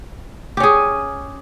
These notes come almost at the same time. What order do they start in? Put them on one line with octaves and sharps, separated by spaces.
G4 C#4 G#4